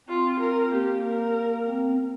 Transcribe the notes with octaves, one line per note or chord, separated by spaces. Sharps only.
C4 F4
A#4
A#3 G4
A#4
C4